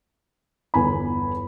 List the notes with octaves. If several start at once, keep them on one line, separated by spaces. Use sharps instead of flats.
G1 E2 G#5 B5